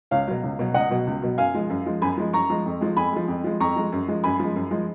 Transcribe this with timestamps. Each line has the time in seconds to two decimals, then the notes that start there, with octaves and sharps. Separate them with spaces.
0.11 C#2 C#5 F5
0.28 B2 F#3
0.44 C#2
0.59 B2 F#3
0.74 C#2 D#5 F#5
0.90 B2 F#3
1.07 C#2
1.22 B2 F#3
1.38 F#2 F5 G#5
1.54 F3 G#3
1.70 F#2
1.86 F3 G#3
2.02 F#2 G#5 B5
2.17 F3 G#3
2.33 F#2 A#5 C#6
2.50 F3 G#3
2.66 F2
2.81 F3 G#3
2.96 F2 G#5 B5
3.12 F3 G#3
3.28 F2
3.44 F3 G#3
3.60 F2 A#5 C#6
3.76 F3 G#3
3.92 F#2
4.08 F3 G#3
4.24 F#2 G#5 B5
4.39 F3 G#3
4.56 F#2
4.71 F3 G#3